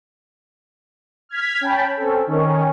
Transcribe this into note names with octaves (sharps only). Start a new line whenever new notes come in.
F6 G#6 B6
C#4 G5 A5 B5
C4 C#4 A4
D#3 C#4